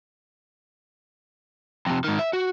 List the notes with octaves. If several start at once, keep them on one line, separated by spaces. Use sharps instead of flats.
F2 C3
G#2 D#3
E5
F#4